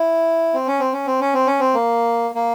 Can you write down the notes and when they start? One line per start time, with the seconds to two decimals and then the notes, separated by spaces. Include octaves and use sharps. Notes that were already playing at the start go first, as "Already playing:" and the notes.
Already playing: E4
0.54 C4
0.67 C#4
0.80 C4
0.93 C#4
1.07 C4
1.21 C#4
1.34 C4
1.47 C#4
1.60 C4
1.74 A#3
2.35 A#3